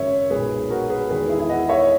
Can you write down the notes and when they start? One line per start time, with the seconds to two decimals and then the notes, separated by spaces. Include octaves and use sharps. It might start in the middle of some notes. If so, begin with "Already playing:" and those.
Already playing: G#1 F#2 C#3 C#5 E5
0.30 B1 A#2 G#3 G#4 B4
0.70 F#4 A#4
0.90 G#4 B4
1.10 E2 D#3 G#3 G#4 B4
1.29 E4 G#4
1.39 E4 G#4
1.49 D#5 F#5
1.69 C#5 E5